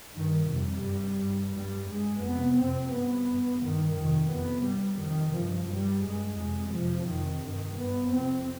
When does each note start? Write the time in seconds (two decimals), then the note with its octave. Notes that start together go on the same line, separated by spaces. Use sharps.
0.16 G2 D#3
0.51 F2 C3 G3
0.85 G2
1.20 G2
1.55 G2 G3
1.89 G2 G#3
2.24 F2 C3 B3
2.59 F2 C3 C4
2.93 G2 B3
3.27 G2
3.62 G2 D#3
3.97 F2 C3 D#3
4.31 F2 C3 B3
4.66 G2 G3
5.01 F2 C3 D#3
5.36 G2 F3
5.70 G2 G3
6.05 G2 G#3
6.39 F2 C3
6.74 F2 C3 F3
7.08 F2 C3 D#3
7.43 G2 D#3
7.78 G2 B3
8.13 F2 C3 C4